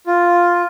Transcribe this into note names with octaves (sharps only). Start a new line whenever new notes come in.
F4